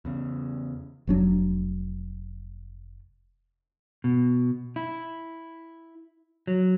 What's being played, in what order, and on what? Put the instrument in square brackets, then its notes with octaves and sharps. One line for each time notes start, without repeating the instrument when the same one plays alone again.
[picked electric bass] E2 C#3
[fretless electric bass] F1 F#3 D4
[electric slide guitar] B2
E4
F#3